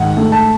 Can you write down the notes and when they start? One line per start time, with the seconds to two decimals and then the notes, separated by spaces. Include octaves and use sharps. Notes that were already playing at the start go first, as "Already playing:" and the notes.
Already playing: G#2 D#3 F#5
0.17 A3
0.32 A5